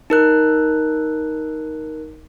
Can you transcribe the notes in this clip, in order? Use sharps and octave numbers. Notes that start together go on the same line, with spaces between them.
D#4 A#4 F#6